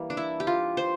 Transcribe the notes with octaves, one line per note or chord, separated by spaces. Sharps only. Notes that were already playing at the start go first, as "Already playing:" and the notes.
Already playing: E3 G3 A#3
D4
E4
G4
F4
C5